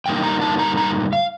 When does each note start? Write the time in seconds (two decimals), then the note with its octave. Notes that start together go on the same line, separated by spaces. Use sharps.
0.06 G2 D3 G3 A#3 D#4 G5
0.24 A#5
0.41 A5
0.59 A#5
0.77 A#5
1.13 F5